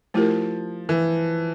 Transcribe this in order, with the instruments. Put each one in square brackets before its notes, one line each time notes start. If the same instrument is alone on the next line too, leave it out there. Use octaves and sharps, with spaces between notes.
[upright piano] F3 [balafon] A3 E4 G4 A#4
[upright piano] E3